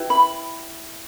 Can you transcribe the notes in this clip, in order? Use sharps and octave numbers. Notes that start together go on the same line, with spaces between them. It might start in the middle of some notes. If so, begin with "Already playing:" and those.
Already playing: E4 G4 B4
B5